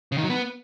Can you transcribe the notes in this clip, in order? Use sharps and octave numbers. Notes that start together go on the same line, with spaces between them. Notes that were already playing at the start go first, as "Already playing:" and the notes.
C#3
D#3
F#3
B3